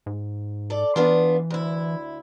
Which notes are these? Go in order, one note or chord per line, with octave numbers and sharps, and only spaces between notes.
G#2
A4 D5
E3 B3 D4 F4
D2 E4